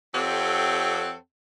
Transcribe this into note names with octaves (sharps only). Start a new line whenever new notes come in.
F2 C4 G4 A4 C#5 F#5